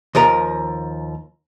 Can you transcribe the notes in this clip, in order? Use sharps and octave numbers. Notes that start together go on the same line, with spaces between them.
D#2 F3 A#4 A#5